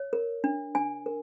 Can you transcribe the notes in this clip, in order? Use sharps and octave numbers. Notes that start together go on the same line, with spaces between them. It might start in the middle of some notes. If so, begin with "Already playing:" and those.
Already playing: C#5
A#4
D4
D4 G#5
A#4